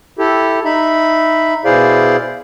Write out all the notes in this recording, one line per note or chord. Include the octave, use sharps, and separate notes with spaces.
E4 G4 A4
D#4 E5 B5
B2 E4 G#4 C5 D5 F5